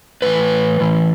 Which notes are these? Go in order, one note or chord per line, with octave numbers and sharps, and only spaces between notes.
A2 E3 B4
A2 E3